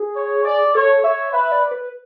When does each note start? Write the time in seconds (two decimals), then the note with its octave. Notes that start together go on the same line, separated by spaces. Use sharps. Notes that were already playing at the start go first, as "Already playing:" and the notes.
Already playing: G#4
0.16 C#5
0.45 D5
0.74 A4 C#5
1.04 C#5 E5
1.32 B4 E5
1.52 D5
1.71 B4